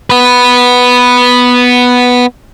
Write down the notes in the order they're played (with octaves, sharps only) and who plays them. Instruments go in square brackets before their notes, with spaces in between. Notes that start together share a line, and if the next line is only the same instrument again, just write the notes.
[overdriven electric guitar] B3 B4